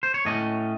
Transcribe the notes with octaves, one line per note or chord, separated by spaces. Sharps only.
C5
C#5
A2 A3 C#4 D#5